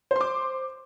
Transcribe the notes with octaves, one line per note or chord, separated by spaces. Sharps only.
C5 C6 D6